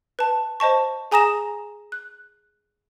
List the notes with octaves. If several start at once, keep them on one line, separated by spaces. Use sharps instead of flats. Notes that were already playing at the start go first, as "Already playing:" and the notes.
B4 A5
C5 D#5 A5 C#6
G#4 G#5 A#5 D#6 A#6 E7
F#6